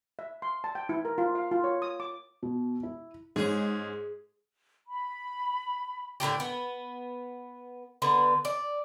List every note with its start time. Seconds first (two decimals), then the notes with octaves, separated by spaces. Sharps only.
0.19 E5
0.42 C6
0.64 A5
0.75 G5
0.89 E4
1.05 A#4
1.18 F4
1.35 F5
1.52 F4
1.64 C#5
1.82 D#6
2.00 D6
2.43 B2
2.83 E4
3.36 G#2 G#3 C#4 G#4
4.89 B5
6.20 A2 D3 D#3 G4
6.40 B3
8.02 D3 B3 B4
8.45 D5